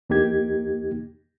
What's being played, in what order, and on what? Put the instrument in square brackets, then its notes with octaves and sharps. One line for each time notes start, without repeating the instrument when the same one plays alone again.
[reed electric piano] E2 A#3 D#4 G4 G#6